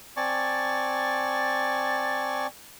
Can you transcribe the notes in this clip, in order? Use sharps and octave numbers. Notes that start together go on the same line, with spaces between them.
C4 D5 G#5 A5 C#6